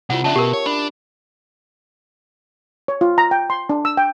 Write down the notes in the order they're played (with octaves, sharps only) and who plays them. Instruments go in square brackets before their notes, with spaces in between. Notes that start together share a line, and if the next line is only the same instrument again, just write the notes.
[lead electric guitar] C3 E4 [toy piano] F4 F#5
[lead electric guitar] C#3 D4 [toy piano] C#4 E5 A5
[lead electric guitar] B2 [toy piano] G4 A#4
[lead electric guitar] C#5
[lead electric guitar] D4 [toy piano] B5
[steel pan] C#5
F4
A#5
G5
C6
D4
E6
G5